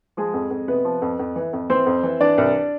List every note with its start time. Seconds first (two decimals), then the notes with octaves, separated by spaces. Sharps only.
0.17 F3 G#3 G#4
0.34 F2
0.51 F2
0.68 C3 B3 B4
0.85 F3
1.02 F2
1.19 F2
1.36 E3
1.53 F2
1.70 E3 C4 C5
1.86 F2
2.03 E3
2.20 E3 D4 D5
2.38 C2